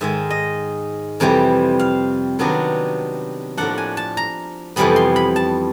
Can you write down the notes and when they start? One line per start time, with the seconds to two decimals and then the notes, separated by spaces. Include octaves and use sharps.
0.01 G#2 D#3 G#3 E5
0.30 D#5
1.20 F2 C3 E3 G3 C4
1.79 F5
2.39 C3 D#3 F#3 B3 D4
3.57 A2 F3 A#3 D4 F#5
3.78 G#5
3.97 A5
4.17 A#5
4.76 F2 C3 E3 G3 B3 B5
4.96 C6
5.16 B5
5.36 A5